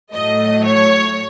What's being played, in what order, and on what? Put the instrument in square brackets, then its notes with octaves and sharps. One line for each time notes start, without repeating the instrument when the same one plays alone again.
[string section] A2 F#3 A3 D#5
C#5